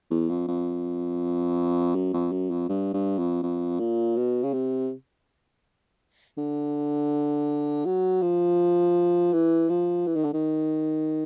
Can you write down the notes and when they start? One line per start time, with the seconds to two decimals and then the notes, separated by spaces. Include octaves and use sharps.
0.11 E2
0.29 F2
0.47 F2
1.95 F#2
2.13 F2
2.32 F#2
2.51 F2
2.69 G2
2.93 G2
3.18 F2
3.42 F2
3.80 A#2
4.17 B2
4.43 C#3
4.53 C3
6.37 D3
7.85 F#3
8.22 F3
9.33 E3
9.69 F3
10.07 E3
10.16 D#3
10.24 D3
10.33 D#3